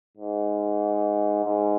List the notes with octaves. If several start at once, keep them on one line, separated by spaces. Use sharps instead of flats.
G#2
G#2